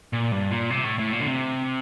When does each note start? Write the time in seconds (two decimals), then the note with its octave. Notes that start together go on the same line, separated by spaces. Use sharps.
0.13 A#2
0.32 G2
0.51 A#2
0.70 C3
0.84 A2
0.99 A2
1.13 A#2
1.21 D3
1.27 C3